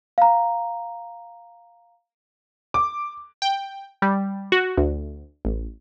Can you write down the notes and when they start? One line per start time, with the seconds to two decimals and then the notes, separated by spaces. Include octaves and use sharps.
0.18 F5 A#5
2.74 D6
3.42 G5
4.02 G3
4.52 F#4
4.77 D2
5.45 A1